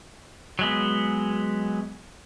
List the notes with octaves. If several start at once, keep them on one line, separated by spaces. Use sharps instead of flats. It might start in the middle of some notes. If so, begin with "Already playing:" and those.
F#3 G#3 B3